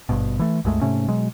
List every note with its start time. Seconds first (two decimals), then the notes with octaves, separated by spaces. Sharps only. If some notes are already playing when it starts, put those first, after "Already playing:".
0.09 G#1 G2 B2
0.39 E3 A3
0.65 C2 F#2 G#3 A3
0.81 G#2 C3 A3 C#4
1.08 B2 F#3 G#3